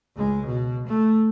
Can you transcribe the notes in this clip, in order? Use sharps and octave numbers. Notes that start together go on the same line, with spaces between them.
C#2 G#3
B2
A3